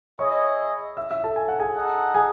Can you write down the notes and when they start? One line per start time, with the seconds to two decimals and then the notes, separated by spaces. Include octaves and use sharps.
0.19 E4 G#4 C#5 D#5 C#6
0.97 E5 E6
1.11 E5 E6
1.24 A4 A5
1.36 G#5
1.48 F#5
1.59 G#4 G#5
1.75 D#4 A4 D#5 F#5
2.14 G#4 G#5